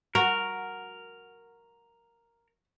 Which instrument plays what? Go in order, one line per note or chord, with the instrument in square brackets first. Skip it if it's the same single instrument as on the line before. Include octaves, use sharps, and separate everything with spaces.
[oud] F#4 [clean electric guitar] A#4